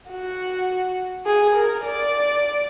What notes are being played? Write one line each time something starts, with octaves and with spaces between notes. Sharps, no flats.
F#4
G#4
A#4
D5